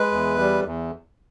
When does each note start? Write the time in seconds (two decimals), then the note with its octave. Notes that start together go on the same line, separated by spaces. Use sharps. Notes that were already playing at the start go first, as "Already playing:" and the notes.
Already playing: G#3 B4
0.12 E2
0.39 G3
0.66 E2